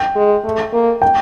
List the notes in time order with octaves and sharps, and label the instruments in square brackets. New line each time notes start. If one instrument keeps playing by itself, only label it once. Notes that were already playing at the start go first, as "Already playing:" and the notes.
Already playing: [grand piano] G5
[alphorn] G#3
A3
A#3
[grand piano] G5